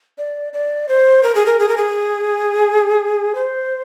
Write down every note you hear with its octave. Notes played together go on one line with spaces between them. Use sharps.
D5
D5
C5
A#4
G#4
A#4
G#4
A#4
G#4
C5